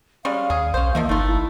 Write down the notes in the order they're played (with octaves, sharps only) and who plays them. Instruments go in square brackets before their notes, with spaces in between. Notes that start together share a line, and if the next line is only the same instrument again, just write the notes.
[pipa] G3 G#3 C#4 [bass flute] F5
[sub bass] D#2 [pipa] G#4
[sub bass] B1 [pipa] C#4 C5
[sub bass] E3 [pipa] F3 D#5 E5 [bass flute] A#3
[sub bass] G1 [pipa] A3 F4 [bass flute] D#4
[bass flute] E4